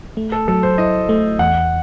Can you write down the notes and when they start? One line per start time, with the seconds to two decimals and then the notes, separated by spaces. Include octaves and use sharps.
0.17 A3
0.32 A4
0.48 F#3 A4
0.63 C5
0.78 E4 D#5
1.09 A3
1.39 E2 F#5